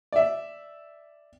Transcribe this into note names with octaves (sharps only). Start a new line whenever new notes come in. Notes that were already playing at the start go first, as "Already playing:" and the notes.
D5 E5